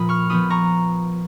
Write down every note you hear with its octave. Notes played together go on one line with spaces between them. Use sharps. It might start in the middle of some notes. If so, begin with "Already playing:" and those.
Already playing: A#2 F3 F4 B5 D#6
C#6 F6
F3 B3 F4 B5 D#6
A#5 C#6